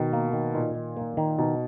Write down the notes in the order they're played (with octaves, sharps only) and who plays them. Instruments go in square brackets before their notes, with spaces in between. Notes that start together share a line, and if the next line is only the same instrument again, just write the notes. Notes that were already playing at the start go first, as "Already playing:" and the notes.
Already playing: [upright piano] B2 [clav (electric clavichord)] D#3
[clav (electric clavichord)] A#3
D#3
[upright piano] A#2 [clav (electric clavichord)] D#4
[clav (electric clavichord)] D#3
A#3
D#3
[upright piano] B2 [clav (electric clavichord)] D#4